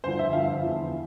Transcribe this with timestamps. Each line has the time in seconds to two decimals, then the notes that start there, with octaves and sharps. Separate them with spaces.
0.04 G2 D3 F3 C5
0.19 E5
0.33 G2 D3 F3 F5
0.48 E5
0.63 E2 D3 F3